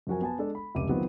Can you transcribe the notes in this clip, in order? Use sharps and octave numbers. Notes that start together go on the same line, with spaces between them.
F#2 F3 F#4 A#4 G#5
B3 G#5 A5
G#3 D4 A4
B5
F1 C#2 C#3 D6 D#7
D#3 F#3 B3 C4 F4 F#4